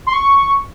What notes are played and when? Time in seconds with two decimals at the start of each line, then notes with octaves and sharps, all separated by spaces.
0.07 C6
0.13 C#6